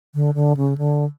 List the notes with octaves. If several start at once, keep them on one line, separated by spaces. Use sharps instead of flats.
D3
D3
C#3
D3